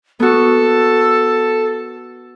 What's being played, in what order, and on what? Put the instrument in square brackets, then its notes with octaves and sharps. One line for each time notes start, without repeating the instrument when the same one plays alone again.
[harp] B3 F#4 [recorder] A4